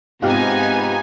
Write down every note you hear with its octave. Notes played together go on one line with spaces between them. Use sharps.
G#2 C3 B3 D#4 F4 G4 F5 G#5